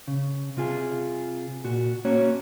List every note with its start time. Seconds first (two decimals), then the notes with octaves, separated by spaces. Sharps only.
0.08 C#3
0.57 C3 F4 G#4
1.64 A#2 F#4
2.05 A#3 C#4 F#4 C#5